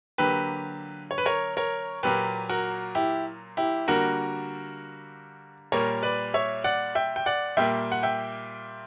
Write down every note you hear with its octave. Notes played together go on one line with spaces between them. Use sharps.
D3 F#3 A#3 G4 B4
C#5
B4
A#4 C#5
A#4 C#5
A#2 F#3 A#3 G4 B4
F#4 A#4
E4 G4
E4 G4
D3 G3 A#3 F#4 A#4
A#2 G3 A#3 A#4 C#5
B4 D5
C#5 E5
D5 F#5
E5 G5
G5
D5 F#5
A#2 G3 A#3 E5 G5
F#5
E5 G5